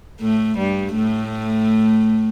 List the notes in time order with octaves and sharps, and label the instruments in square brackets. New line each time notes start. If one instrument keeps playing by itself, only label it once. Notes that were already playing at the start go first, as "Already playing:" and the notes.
[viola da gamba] A2 A3
G2 G3
A2 A3